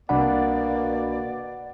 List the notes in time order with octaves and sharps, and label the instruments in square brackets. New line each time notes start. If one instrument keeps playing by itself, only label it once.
[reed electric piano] C2 D4 B5 [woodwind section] B2 D5 [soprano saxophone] A#3 [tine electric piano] F#5